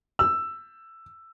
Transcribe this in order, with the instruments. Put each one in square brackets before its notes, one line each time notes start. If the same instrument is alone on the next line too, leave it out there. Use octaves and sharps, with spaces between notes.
[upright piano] E6